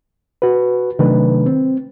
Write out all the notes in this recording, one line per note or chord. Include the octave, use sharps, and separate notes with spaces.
F#4 B4
C3 D#3 F#3 A3 D4 B4
C4